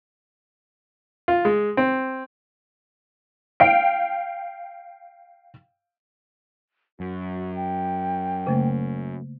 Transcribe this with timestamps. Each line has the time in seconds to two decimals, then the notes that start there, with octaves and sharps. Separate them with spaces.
1.28 F4
1.45 G#3
1.77 C4
3.60 F5 G5 D7
7.00 F#2 F#4
7.55 G5
8.47 C#3 A3 A#3